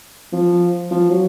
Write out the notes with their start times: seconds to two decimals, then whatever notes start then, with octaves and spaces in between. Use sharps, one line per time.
0.33 F3
0.91 F3
1.10 F#3